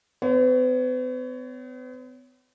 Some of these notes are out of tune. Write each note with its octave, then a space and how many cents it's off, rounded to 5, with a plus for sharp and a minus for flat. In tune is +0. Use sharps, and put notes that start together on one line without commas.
B3 +45 C#5 +20